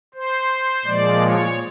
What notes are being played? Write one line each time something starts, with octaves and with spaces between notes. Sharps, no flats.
C5
A#2 F3 G#3 D5
C#5